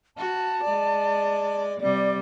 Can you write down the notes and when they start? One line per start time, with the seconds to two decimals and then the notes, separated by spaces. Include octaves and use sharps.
0.17 F#4 A5
0.63 G#3 D5
1.80 C3 G3 D5